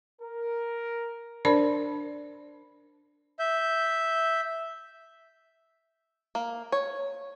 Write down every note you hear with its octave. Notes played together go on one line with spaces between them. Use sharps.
A#4
D4 A#4 C5 D5 A5 B5
E5 G6
A#3
C#5